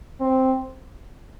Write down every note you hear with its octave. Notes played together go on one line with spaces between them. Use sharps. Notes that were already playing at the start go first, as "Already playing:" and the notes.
C4